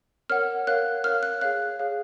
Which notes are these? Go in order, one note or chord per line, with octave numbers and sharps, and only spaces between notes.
A#4 C#5 F#5 F6
A#4 C#5 F5 F#6
A#4 C#5 F5 F6
F#6
G#4 C#5 F5 F#6
G#4 C#5 F5